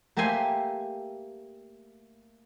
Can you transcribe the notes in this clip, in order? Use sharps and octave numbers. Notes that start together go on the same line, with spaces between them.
A3 A#3 G4 E5 G#5 C6